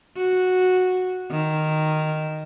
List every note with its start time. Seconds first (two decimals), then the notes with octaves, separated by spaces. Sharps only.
0.17 F#4
1.31 D#3